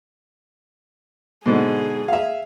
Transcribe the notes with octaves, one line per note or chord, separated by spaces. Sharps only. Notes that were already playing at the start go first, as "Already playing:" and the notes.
G#2 B2 D3 G#4
E5 F5